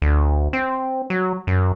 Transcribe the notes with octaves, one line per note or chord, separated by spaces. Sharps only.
D2
C4
F#3
F#2